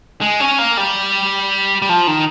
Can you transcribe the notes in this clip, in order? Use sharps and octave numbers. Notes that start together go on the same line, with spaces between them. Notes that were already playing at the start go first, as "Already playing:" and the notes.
G#3
C#4
A#3
G3
G3
F3
D#3